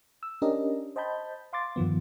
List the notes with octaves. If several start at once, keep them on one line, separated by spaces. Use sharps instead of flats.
E6
C#4 D4 G4 A#4 D#5
C5 D#5 G5 A5 B5 G6
F5 C6 D6 A6
G2 D#3 F3 B3